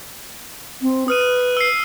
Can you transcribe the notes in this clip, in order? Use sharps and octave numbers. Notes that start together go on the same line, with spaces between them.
C4
B4 D#6 F6 D#7
E6 C7